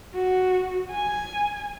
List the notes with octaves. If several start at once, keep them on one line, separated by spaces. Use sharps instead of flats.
F#4
G#5